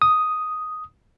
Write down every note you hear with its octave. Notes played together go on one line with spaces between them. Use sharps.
D#6